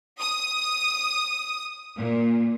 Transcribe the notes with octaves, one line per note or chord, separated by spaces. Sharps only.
D#6
A#2